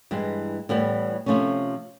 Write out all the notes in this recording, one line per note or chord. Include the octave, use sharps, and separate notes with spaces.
G2 E3 G#3
A2 E3 G3 B3
C3 F3 A3 C#4